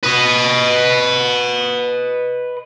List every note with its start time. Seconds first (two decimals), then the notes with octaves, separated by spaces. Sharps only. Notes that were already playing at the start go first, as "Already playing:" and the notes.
0.04 B4 D#5